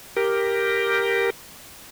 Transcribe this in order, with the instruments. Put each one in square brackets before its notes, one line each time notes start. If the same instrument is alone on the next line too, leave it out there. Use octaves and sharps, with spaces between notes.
[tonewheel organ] G4 A#4